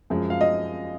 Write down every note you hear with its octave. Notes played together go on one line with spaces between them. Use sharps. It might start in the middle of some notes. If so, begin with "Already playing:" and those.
F#2 F3 G#3
F5
D#5